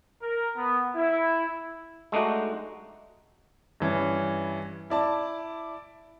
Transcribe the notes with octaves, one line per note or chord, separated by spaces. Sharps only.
A#4
B3
E4
G#3 A3 D4 D#4 F#4
G2 E3 C#4
E4 D5 A5